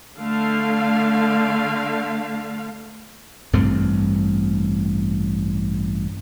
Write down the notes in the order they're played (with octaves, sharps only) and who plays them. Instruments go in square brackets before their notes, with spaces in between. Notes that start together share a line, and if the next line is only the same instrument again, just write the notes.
[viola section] D3 A3 F5
[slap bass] A1 G2 A3 C4